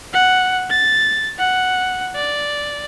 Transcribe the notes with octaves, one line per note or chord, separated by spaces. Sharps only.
F#5
A6
F#5
D5